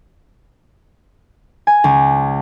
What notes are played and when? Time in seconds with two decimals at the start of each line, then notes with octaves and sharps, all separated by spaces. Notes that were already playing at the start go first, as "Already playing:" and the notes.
1.67 G#5
1.84 C#2